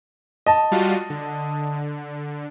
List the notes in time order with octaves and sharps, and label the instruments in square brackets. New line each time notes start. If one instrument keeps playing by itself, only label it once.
[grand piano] D#5 A5
[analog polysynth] G3 F4 F#4
D3